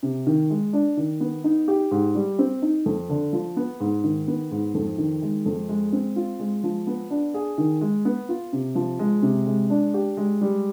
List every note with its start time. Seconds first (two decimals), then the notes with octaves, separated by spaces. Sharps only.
0.03 C3
0.26 D#3
0.50 G#3
0.73 D4
0.97 D#3
1.20 B3
1.44 D#4
1.68 G4
1.91 G#2
2.15 G3
2.39 C4
2.62 D#4
2.86 F2
3.09 D3
3.33 F3
3.57 B3
3.80 G#2
4.04 D#3
4.28 B3
4.51 G#2
4.74 F2
4.98 D#3
5.22 G#3
5.45 F2
5.69 G#3
5.92 C4
6.16 F4
6.39 G#3
6.64 F3
6.87 B3
7.10 D4
7.34 G#4
7.58 D#3
7.81 G#3
8.05 B3
8.29 F4
8.53 C3
8.75 F3
8.99 G#3
9.22 C3
9.46 G#3
9.70 D4
9.94 G4
10.17 G#3
10.41 G3